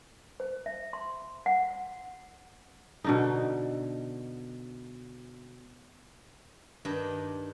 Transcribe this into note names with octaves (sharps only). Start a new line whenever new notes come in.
C5
E5
C6
F#5
B2 D3 D#4
G2 D#3 D4 D#5